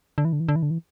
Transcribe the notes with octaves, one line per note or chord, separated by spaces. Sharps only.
D3
E3
D3
E3
D3
E3
D3
E3